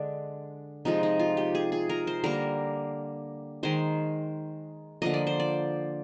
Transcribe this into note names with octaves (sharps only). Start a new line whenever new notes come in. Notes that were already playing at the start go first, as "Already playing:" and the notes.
Already playing: D3 G#3 D4
C3 F3 G#3 D#4
D#4
F4
G4
G#4
G#4
A#4
C5
D3 G3 A#3 A#4
D#3 G#3 C5
D3 F3 A#3 D#5
D5
C5
D5